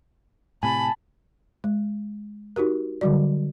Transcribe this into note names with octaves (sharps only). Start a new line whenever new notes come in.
A2 C3 G#5 A5 B5
G#3
D#4 F#4 G4 A#4
D3 F#3 G3 F#4 D5